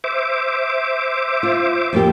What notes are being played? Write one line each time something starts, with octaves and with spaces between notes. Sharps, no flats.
C5 E5 D6
F4
F2 A#3 G4